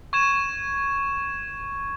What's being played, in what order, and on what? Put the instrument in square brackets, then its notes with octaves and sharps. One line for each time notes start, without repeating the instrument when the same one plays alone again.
[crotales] C#6 G#6 E7